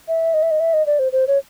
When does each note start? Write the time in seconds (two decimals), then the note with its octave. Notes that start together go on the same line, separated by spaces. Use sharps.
0.08 E5
0.34 D#5
0.43 E5
0.51 D#5
0.60 E5
0.73 D#5
0.86 D5
0.99 C5
1.12 C5
1.27 C#5